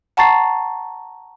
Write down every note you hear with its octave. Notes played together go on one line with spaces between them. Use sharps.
F#5 A5 A#5 C#6 A6 C7